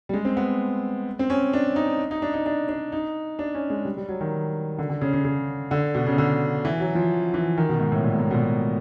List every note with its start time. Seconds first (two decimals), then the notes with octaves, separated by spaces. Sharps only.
0.09 G3
0.13 G#3
0.25 C4
0.37 B3
1.19 C4
1.30 C#4
1.53 D4
1.76 D#4
2.11 D#4
2.22 D4
2.34 D#4
2.46 D4
2.69 D4
2.92 D#4
3.39 D4
3.55 C#4
3.70 G#3
3.85 G3
3.97 G3
4.09 F#3
4.21 D#3
4.79 D3
4.90 D3
5.01 C#3
5.13 C#3
5.25 C#3
5.71 D3
5.95 B2
6.07 C#3
6.18 D3
6.65 E3
6.80 F#3
6.95 F3
7.34 E3
7.57 D#3
7.69 B2
7.80 G#2
7.92 A2
8.04 A#2
8.14 G#2
8.19 A2
8.31 B2
8.35 A#2